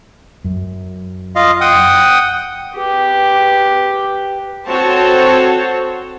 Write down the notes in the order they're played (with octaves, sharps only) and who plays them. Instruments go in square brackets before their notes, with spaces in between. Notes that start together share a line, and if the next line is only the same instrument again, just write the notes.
[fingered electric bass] F#2
[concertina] F4 D#5 F5
F#5 G5 D#6
[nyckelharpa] G4 B4
[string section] C4 F#4 A4 C5 C#5 A5